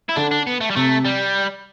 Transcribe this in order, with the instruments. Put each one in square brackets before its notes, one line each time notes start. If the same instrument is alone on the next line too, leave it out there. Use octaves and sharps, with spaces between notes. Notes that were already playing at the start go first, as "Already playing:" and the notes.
[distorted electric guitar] E4
[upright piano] D3 [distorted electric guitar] D4
[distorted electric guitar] D4
B3
A3
G3
[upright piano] C3 [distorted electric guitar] A3
[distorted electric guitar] G3